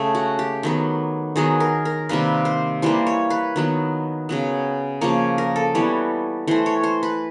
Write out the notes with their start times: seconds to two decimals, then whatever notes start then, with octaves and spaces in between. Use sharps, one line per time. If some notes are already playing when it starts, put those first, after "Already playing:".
Already playing: C#3 A3
0.15 F#4
0.39 G4
0.63 D#3 F#3 B3
1.36 D#3 F#3 B3 G#4
1.60 A#4
1.85 A#4
2.09 C3 D#3 G3 A#3 B4
2.45 C5
2.82 E3 G3 A#3 C5
3.07 C#5
3.30 B4
3.56 D#3 F#3 B3
4.29 C#3 F#3 B3
5.01 C#3 F3 A#3 C#5
5.38 A#4
5.56 A4
5.75 E3 G3 B3 C#5
6.47 E3 A3 C5
6.66 C#5
6.84 C5
7.03 B4